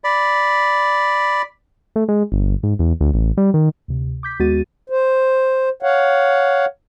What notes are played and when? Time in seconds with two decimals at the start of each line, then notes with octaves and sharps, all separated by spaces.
0.04 D5 B5
1.96 A3
2.09 G#3
2.32 G1
2.63 G#2
2.79 E2
3.01 D2
3.14 A1
3.37 G3
3.54 D#3
3.88 D2 C3
4.23 D6 G6 B6
4.39 D#2 G#3 B3 F#4 A6 D#7
4.90 C5
5.83 C#5 F5 F#5